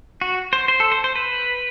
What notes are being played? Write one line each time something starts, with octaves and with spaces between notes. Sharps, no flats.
F#4
C5
C5
A4
C5
C5
B4